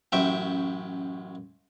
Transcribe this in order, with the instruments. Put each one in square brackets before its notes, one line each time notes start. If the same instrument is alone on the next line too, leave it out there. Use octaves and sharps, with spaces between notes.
[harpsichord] A1 F#2 E5 G5